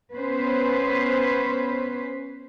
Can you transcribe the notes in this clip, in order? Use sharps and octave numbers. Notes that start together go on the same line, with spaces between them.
B3 C#4 B4 C5